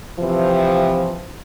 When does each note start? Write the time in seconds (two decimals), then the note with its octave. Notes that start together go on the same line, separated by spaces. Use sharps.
0.19 C3 E3 F3